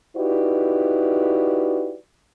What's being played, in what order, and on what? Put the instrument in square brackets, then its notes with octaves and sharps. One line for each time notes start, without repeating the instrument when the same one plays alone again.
[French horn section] D#4 E4 F#4 G4 B4 D5